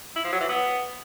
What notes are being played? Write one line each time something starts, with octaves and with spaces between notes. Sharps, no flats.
E4
F3
F#3
E3
B3